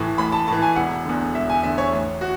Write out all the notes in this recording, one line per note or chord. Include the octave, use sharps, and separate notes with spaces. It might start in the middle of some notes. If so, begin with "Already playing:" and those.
Already playing: A1 A2 E3
A1 B5
A5
A2 E3 A5
G#5
E1 F#5
E2 D3
E1 E5
G#5
E2 D3 E5
C#5
A1
F#4